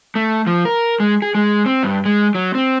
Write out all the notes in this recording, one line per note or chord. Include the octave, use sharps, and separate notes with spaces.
A3
F3
A#4
G#3
G#4
G#3
C4
G2
G#3
F#3
C4